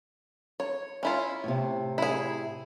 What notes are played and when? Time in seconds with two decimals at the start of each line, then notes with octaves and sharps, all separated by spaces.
0.60 C#5
1.03 C#4 E4 F4
1.44 A2 C3
1.98 E4 G#4